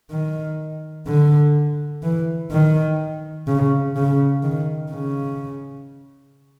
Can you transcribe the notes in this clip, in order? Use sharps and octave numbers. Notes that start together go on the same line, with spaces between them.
D#3
D3
E3
D#3
C#3
C#3
D#3
C#3